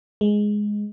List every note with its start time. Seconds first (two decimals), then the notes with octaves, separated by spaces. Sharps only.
0.21 G#3